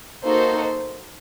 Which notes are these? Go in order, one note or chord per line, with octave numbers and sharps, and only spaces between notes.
A#3 D#4 F#4 A4 C5